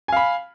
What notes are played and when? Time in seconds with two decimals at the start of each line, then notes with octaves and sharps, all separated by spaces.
0.08 G#5
0.12 F5
0.17 B5